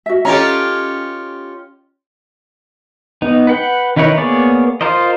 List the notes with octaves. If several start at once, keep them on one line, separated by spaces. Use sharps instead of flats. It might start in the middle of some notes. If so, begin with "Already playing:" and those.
F#4 E5
C#4 F4 G4 A4 D#5 A#5
B3 D#4
B4 F#5 G5
D#3 D#4 E4 B4 C#5
A#3 B3 G#4 C#5 D5
F4 A#4 C5 D#5